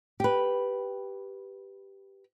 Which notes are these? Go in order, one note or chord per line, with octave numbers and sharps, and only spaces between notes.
G4 B4